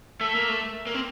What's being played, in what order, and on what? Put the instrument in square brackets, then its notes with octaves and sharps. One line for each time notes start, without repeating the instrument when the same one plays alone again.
[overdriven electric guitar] A3 [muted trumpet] E5
[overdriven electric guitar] A#3
A3
A#3
C4